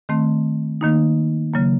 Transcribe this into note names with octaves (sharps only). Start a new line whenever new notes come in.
D#3 A3 C4
D#3 A#3 D#4
C#3 F#3 A#3